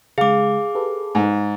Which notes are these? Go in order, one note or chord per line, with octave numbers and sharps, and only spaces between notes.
C#3 G#3 G#4 F5 D6
G4 A4 B4
G#2